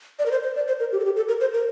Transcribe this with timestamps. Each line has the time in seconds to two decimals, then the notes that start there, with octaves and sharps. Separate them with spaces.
0.19 D5
0.26 A#4
0.31 C5
0.43 C5
0.56 D5
0.68 C5
0.80 A#4
0.92 G4
1.00 A4
1.05 G4
1.16 A4
1.28 A#4
1.41 C5
1.53 A#4